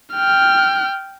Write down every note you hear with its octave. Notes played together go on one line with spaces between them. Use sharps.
G5 F6